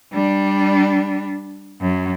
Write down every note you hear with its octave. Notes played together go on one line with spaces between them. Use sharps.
G3 D4
F#2